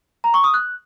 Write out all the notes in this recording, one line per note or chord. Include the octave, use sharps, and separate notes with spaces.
A#5
C#6
D#6
F#6